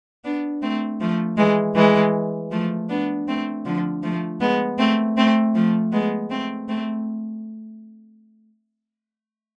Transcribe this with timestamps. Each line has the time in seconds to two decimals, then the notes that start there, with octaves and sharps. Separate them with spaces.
0.24 B3 D4
0.62 A3 C4
1.01 F3 A3
1.37 E3 G#3
1.75 E3 G#3
2.51 F3 A3
2.89 B3 D4
3.28 A3 C4
3.66 D3 F3
4.03 F3 A3
4.41 G#3 B3
4.78 A3 C4
5.17 A3 C4
5.55 F3 A3
5.92 G#3 B3
6.30 A3 C4
6.68 A3 C4